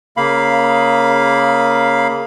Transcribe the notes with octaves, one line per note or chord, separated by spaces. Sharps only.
C#3 A#3 F5 B5